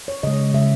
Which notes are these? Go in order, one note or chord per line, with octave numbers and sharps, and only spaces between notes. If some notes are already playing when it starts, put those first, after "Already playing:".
C#5
C#3 G#3 D#5
C#3 G#3 E5